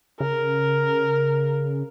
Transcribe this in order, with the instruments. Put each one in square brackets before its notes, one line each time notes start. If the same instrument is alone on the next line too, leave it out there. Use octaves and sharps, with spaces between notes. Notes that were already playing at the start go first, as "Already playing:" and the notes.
[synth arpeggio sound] C#3 [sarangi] A#4